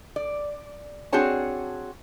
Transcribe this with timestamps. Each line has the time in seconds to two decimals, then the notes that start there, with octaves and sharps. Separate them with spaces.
0.16 D5
1.12 C4 D4 F#4 G#4 C#5 A5